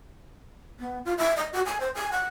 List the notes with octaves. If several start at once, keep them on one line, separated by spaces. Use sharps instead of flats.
B3
F4
E5
D#5
F#4
G#5
C5
G#5
F#5